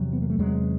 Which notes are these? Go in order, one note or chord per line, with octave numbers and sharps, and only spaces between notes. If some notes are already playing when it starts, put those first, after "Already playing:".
Already playing: E2 C3 F#3
B3
A#3
A3
E2 C3 F#3 G#3